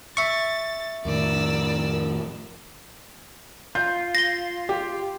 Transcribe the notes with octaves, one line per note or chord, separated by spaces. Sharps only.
E5 C#6 A6
F2 A2 D#3 A#4 D5 E6
F4 G6
A#6 G7
G4